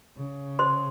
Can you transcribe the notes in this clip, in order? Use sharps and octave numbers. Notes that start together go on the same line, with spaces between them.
C#3
C5 C6